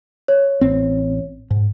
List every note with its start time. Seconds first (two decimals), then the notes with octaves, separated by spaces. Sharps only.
0.28 C#5
0.61 A1 C4
1.51 G#2